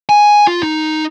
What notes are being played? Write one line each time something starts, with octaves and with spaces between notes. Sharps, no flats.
G#5
F4
D#4